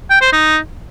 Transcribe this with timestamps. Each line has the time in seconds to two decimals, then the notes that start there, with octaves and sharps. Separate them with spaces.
0.10 G5
0.21 C5
0.32 D#4